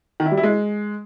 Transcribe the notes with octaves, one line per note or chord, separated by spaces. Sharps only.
D#3
E4
G3
E4
G#3